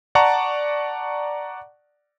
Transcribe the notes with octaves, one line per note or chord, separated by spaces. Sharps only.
D5 F#5 A5 A#5 C#6